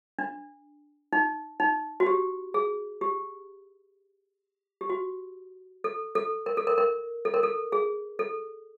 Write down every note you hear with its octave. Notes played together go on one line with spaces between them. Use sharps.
D4
D#4
D#4
F#4
G4
G#4
G4
G4
F#4
A4
A4
A#4
A4
A#4
A#4
A4
A#4
A4
G#4
A4